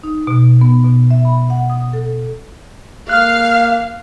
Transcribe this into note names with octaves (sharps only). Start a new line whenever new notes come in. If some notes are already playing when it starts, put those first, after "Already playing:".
D#4
B2
B3
B2
E5
B5
F#5
D#6
A4
A#3 F5 F6 F#6